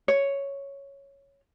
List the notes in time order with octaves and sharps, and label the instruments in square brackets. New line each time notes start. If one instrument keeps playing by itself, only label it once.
[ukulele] C#5